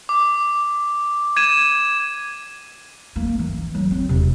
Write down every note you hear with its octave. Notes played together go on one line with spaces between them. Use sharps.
D6
G#6 D#7 E7
A#3
E3
F#3
C4
E1 C3